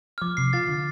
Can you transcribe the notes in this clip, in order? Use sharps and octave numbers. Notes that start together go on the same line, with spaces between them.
F6
F3 D6
C3 C7
F4 A6
D3